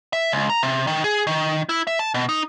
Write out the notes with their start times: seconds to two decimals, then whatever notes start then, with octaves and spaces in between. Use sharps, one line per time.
0.13 E5
0.32 C#2
0.50 A#5
0.63 C3
0.87 D#3
1.04 G#4
1.27 D#3
1.69 E4
1.87 E5
1.99 A5
2.14 B2
2.29 D#4